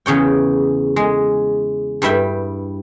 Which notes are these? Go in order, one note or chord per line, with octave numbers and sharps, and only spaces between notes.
E2 C#3 C#5 G5
G#3
G2 G3 E4 E5 G5